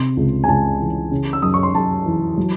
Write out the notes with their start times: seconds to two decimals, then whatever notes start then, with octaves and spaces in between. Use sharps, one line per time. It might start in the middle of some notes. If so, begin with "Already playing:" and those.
Already playing: C3 C6
0.17 C#2
0.44 G#5
0.48 C#2 A5
0.80 E3
1.11 C#3
1.33 E6
1.42 F#2 D#6
1.54 C#6
1.63 C6
1.75 F#2 A5
2.06 E3
2.37 F#3